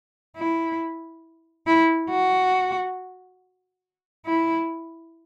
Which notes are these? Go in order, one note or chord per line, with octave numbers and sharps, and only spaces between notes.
E4
E4
F#4
E4